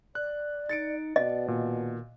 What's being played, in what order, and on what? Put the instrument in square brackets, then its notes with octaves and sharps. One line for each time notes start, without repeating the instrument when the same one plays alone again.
[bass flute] D5 [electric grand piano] F#6
[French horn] D#4 [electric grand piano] A6 C#7 D7
[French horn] B2 [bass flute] D5 [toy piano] D#5
[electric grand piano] A#2 [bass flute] D#3